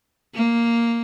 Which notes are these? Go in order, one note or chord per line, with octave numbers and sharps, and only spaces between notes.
A#3